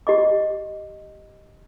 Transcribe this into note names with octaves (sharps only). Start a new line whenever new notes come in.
G4 D#5 D6